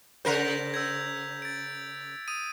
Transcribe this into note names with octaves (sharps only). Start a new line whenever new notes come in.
C#3 A#4 C5 G6 B6 F7
E6 G6 G#6
A6 D7
D#6 D#7